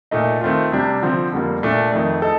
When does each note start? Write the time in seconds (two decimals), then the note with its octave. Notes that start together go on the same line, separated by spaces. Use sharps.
0.11 A#2 A3 D#4
0.41 D#3 A3 C4 F4
0.72 C3 G3 D4 G4
1.02 D3 F3 C4
1.32 F2 D3 G3 A#3
1.63 A#2 A3 D4
1.92 F2 D#3 A3
2.22 D#4 A4